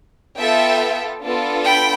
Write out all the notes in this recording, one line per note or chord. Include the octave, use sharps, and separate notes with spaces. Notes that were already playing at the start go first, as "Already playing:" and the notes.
B3 F4 A4 E5 G5
B3 D4 F4 A4
G5 B5